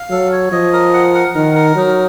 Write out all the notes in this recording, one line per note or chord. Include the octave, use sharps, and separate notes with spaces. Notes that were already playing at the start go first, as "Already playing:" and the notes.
Already playing: F5
F#3 A4
C#5
F3 D#5
A#4
F#5
F#5
D#3 A#4
A#4
F#3 D#4